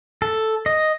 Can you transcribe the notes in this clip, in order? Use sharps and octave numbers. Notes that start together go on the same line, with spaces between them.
A4
D#5